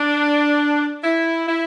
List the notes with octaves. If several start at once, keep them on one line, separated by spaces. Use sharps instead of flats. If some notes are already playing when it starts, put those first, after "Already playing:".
Already playing: D4
E4
E4